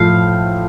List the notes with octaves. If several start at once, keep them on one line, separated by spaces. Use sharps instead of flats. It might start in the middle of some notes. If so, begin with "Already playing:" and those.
Already playing: A2 F3 A3 F5